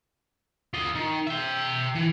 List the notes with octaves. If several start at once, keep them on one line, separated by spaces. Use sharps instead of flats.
F4 D#5
D#3
E5 G5
E3